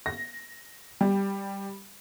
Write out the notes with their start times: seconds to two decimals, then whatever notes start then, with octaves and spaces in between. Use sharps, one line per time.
0.06 A#6
1.01 G3